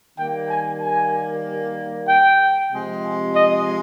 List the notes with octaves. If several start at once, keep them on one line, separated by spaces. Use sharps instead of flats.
D#3 G3 A#3 G5
G#5
G#5
G5
C3 F3 G#3
D#5